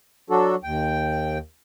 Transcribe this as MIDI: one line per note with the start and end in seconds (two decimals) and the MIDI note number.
0.30 0.55 54
0.30 0.55 62
0.30 0.55 66
0.30 0.55 69
0.64 1.38 39
0.64 1.38 79